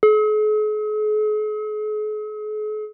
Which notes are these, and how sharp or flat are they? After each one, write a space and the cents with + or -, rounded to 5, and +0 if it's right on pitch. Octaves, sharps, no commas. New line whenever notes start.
G#4 +45